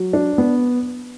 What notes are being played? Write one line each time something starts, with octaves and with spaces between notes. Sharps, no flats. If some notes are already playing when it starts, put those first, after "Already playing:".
Already playing: F#3
D4
B3